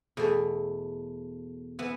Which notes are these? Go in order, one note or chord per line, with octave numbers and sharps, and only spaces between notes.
E2 B2 A3
E3 B3 E4